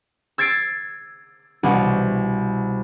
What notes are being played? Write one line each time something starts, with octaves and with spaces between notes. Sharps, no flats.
E6 G#6 A6 C7 D7
C2 B2